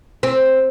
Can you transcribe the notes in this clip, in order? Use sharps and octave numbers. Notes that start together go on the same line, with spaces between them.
C4